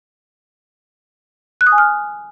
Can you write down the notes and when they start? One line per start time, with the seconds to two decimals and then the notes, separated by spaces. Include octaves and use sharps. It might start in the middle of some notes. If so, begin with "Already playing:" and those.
1.61 F#6
1.67 D#6
1.72 G#5
1.78 F6